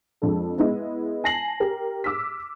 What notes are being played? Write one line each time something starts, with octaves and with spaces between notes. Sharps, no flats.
F2 G#3 D4 A4
G#3 B3 E4 D#5
G#5 A5 A#6 C7 F#7
G4 A#4
D6 E6 F6 B6